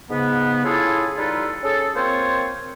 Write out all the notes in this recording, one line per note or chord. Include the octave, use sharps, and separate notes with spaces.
G#2 C#3 B3
C#3 E4 F4 G#4 A4
G3 D#4 F4 A4 B4
C#4 G#4 A4
A#3 C4 F4 C5 C#5